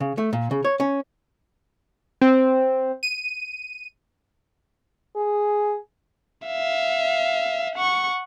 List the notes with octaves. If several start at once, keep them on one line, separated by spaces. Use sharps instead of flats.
C#3
A3
A#2
C#3
C#5
C#4
C4
D#7
G#4
E5 F5
F#5 C#6